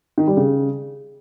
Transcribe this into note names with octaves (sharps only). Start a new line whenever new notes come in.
D#3
G3
C#3